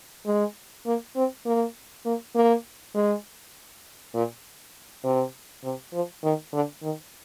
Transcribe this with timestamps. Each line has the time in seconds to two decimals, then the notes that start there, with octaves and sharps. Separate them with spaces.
0.26 G#3
0.86 A#3
1.16 C4
1.46 A#3
2.05 A#3
2.35 A#3
2.95 G#3
4.14 A#2
5.04 C3
5.64 C3
5.93 F3
6.23 D#3
6.53 D3
6.83 D#3